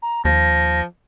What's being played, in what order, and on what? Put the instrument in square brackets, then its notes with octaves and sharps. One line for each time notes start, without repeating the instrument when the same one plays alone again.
[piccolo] A#5
[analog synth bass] D#2 [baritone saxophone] F3 [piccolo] A#6